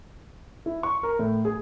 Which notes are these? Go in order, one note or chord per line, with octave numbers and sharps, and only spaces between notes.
E4
C#6
A#4
A2
G#4